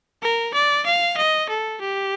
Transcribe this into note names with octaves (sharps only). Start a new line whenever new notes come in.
A#4
D5
F5
D#5
A4
G4